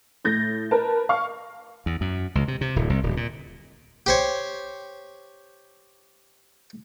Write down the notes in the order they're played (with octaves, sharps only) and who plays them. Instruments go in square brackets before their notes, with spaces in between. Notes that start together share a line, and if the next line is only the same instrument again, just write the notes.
[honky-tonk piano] A2 G6 A6 A#6
A#4 B4 A5
F5 C#6 F6
[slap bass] E2
F#2
C#2
C3
C3
D1
C2
D1
A#2
[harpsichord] G4 C5 C#5